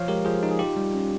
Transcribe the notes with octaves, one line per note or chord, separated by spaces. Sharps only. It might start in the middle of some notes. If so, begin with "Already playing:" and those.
Already playing: F3 C#5 F5
G#3 G4 A#4
F3 G#4
D#4
G#4
F4 G4
G3
C#4